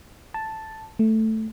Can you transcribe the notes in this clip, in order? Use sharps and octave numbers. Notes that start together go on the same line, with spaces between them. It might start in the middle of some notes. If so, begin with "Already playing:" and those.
A5
A3